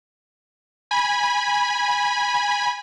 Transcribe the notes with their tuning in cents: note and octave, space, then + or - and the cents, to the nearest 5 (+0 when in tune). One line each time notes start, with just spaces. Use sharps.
G#5 -10 B5 -15